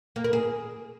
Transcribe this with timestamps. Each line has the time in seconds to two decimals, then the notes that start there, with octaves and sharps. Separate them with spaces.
0.16 A#3
0.24 A#4
0.33 G#4